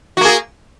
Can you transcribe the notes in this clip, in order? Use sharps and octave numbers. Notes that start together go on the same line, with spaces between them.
A#3 F#4 G#4